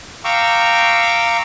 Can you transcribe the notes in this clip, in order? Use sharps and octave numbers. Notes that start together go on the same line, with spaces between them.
F5 G5 A#5 C#6 D6 E6